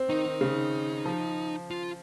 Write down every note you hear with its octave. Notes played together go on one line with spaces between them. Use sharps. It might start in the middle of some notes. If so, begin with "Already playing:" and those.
Already playing: C4
D#3 D#4
D#3
C#3
F3
F4